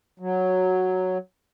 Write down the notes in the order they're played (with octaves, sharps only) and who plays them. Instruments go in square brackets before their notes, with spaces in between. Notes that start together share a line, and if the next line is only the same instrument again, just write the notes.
[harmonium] F#3